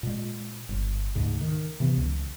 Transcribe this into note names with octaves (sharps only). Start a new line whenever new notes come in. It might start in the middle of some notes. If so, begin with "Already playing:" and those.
A#2 G#3
G1
D2 G#2 C#3
D#3
C3 E3 B3
C#2